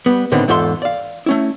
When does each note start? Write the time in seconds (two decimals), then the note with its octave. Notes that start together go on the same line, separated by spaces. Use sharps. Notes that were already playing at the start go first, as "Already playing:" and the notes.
0.06 G3 B3
0.32 A2 D3 D#3 B3 C4
0.48 E2 G#2 F4 A4 A5 C6
0.82 D5 F5
1.26 A3 C#4 E4